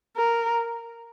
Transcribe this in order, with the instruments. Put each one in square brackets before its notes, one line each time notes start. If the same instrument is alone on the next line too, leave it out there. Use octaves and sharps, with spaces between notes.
[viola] A#4